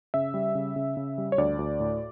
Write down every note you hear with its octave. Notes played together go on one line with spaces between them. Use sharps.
C#3 E5
G3
C#3
C#3
C#3
G3
C#5
D2 D5
D2
A2